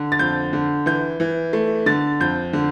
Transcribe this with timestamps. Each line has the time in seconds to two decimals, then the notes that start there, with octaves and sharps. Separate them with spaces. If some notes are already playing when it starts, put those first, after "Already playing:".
Already playing: D3
0.12 A6
0.19 F2 G6
0.53 D3
0.86 E3 G6
1.20 E3
1.53 A3
1.86 D3 A6
2.20 F2 G6
2.53 D3